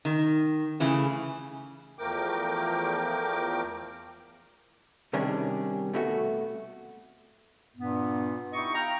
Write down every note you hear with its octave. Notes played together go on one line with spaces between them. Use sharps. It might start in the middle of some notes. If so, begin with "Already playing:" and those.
D#3
C#3 E3 A3
E2 F3 A3 A#4 G5 D6
C3 D#3 G3 C#4 D4 G#4
B2 A3 F#4
G2 A#2 B3
D#4 E4 G4 D#5 C#6
F5 G5 A#5